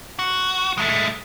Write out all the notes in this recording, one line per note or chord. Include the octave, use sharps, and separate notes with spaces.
F#4
G#3 A3